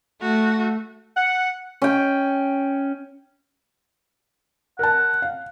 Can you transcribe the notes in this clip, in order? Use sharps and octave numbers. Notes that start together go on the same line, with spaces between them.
A3 F#4
F#5
C#4 G5
A#4 F#5 A5
F5